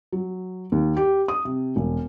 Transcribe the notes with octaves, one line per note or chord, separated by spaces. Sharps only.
F#3
D#2
G4
D#6
C3
E1